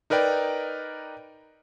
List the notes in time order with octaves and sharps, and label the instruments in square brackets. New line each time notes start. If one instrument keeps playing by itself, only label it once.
[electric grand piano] D#4 A#4 B4 D5 G5